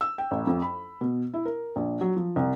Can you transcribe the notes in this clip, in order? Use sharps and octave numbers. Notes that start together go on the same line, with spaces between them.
E6
G5
A1
F2
B5
B2
E4
A#4
A#1
F#3
F3
C2